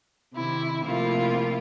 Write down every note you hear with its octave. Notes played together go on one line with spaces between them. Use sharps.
C3 D#3 E4
C3 F3 A3 A#3 E4 F4